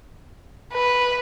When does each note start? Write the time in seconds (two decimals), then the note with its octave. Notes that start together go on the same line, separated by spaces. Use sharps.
0.74 B4